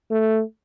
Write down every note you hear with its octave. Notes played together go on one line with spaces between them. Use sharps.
A3